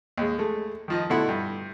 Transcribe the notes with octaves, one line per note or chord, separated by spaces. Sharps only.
D#2 G#3
G#3 A3
D#3 F3 D#5
B2 D3 A3 E4 F#5 C6
G2